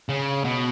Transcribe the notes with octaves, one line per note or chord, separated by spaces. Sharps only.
C#3
B2